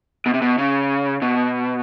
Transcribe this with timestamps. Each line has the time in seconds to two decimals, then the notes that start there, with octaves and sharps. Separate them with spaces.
0.26 B2
0.34 C3
0.42 B2
0.58 C#3
1.22 B2